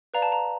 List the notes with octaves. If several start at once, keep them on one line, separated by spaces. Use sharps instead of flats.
B4 D5 F5 A#5
A5
A#5